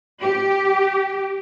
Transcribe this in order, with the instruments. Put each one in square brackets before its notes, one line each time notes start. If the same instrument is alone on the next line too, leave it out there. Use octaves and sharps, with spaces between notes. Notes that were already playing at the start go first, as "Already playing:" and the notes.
[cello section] G4